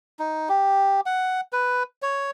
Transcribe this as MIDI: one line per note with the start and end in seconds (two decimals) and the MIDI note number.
0.19 0.49 63
0.49 1.01 67
1.06 1.41 78
1.53 1.83 71
2.02 2.31 73